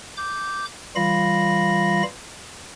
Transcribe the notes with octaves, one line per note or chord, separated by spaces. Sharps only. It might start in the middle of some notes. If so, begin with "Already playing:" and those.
D6 G6
E3 G3 F4 F5 B5 A#6